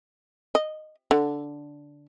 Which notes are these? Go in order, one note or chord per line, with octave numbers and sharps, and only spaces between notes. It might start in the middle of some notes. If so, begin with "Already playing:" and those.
D#5
D3